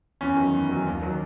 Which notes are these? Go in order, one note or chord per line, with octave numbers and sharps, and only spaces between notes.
E2 C#4
D#3 F#3
E2
D#3 F#3
D#2
D#3 F#3